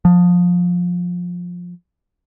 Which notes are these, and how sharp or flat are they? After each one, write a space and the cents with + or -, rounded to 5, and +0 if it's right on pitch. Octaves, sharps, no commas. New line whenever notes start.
F3 +20